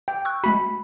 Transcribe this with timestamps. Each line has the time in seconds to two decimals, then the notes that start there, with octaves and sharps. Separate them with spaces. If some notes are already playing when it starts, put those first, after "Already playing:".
0.08 G5
0.25 C#6 E6 F#6
0.44 G#3 A3 F#4 B5